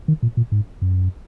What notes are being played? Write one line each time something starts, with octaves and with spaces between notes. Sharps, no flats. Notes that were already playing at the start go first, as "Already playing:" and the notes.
D#3
A#2
A#2
G#2
F#2